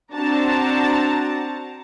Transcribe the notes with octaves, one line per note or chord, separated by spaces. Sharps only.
C4 D4 F#4 A5 A#5